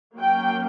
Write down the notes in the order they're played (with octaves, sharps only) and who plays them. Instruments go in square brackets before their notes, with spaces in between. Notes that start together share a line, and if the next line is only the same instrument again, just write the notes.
[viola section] F#3 A#3 C#4 G5